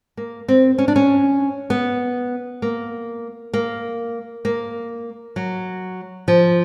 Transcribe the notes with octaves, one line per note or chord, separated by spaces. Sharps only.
A#3
C4
C#4
D4
C#4
B3
A#3
A#3
A#3
F#3
F3